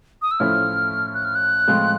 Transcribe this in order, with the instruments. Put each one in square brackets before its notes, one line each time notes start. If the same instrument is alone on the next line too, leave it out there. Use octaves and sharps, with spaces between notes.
[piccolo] D#6
E6
[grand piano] A2 F3 A3 C#4 E4 [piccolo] F6
[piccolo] F#6
F6
F#6
[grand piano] A2 F3 G#3 C4 F4